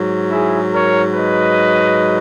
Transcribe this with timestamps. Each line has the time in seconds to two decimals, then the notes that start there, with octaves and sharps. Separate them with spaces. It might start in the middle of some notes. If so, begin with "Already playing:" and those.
Already playing: G#2 F#3
0.32 E4 G#4
0.74 A#4 C#5
1.15 B4 D#5